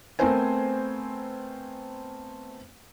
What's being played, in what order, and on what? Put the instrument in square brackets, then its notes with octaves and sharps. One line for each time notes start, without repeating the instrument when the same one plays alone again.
[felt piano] A3 B3 C4 A#4 C5 G#5